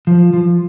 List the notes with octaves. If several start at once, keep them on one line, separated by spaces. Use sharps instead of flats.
F3
F3